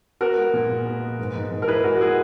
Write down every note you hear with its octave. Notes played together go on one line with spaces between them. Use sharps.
B3 F#4 A#4
G#3
A#2
A#2
B3
G#3
G#2
G#2
G#2
A#4
E3 G#4 B4
G#3 F#4 A#4
F#4
G#3 G#4